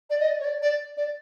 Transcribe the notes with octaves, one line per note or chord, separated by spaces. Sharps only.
D5
D#5
D5
C#5
D5
D5
D5